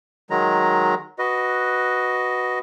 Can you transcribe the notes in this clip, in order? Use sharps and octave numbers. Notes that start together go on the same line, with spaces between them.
D#3 F#3 G#3 A#5
F#4 B4 D#5